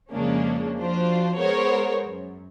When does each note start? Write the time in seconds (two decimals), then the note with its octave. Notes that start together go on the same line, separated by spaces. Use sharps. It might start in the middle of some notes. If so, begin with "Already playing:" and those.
0.12 F2 C#3 G#3 A#3 C#4 D4
0.79 F3 D4 F4 F#4 C5
1.36 G#3 B3 G#4 A#4 C5 C#5
2.04 F#2